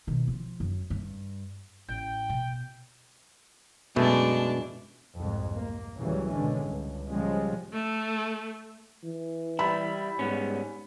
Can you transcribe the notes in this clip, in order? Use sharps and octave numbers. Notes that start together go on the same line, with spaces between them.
B2 D#3
F3
F#2
G2
A1 G5
B2
F#2 B2 G#3 A3 D4
C2 F2 G#2
A#3
C#2 A2 C#3 E3 F#3 G3
G#1 B2 D3 G#3 C#4
C#2 G2
C#3 F3 G3 G#3
A3
E3
G3 E4 B5
G#2 G3 B3 C#4